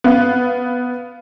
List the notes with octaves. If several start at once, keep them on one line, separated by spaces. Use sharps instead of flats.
B3 F5